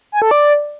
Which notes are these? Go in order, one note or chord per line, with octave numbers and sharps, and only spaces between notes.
G#5
A4
D5